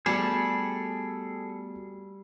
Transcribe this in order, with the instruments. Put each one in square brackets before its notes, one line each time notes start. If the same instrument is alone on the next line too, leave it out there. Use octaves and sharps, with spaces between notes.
[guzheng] G3 [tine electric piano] A3 B3 F#4 [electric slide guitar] G#4 A4